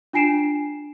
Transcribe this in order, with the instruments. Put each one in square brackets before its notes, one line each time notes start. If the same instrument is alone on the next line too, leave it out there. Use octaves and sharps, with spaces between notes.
[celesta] D4 F4 G#5 C7 D7 E7